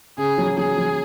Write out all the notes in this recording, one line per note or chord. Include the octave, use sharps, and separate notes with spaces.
C#3 G#4
F#3
F#3 G#4
F#3